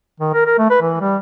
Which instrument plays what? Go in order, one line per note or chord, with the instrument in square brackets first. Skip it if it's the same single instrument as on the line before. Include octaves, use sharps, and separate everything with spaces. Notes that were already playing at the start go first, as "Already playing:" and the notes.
[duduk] D#3
A#4
A#4
A3
B4
E3
G3